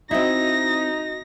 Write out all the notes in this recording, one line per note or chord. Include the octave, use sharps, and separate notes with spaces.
C4 D#4 E4 F#4 D#5 A#6